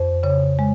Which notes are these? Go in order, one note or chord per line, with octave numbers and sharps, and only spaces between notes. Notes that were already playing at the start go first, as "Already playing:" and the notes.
Already playing: F2 C5
C#3 C#5
G#3